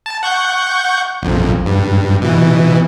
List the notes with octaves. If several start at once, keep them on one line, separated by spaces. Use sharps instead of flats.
A5
F#5 C#6 G6
A#1 F2
G2
B2 E3